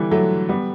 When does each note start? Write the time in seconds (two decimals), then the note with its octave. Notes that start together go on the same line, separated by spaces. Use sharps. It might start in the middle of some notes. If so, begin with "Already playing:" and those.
Already playing: D3 E3 G3
0.11 F#3 A3
0.49 G3 B3